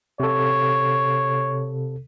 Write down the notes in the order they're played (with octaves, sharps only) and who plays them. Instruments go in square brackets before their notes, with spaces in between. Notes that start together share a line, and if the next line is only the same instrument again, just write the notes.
[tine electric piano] C3 A4 [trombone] C#5